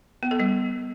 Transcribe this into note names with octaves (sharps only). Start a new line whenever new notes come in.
B3
A4
G3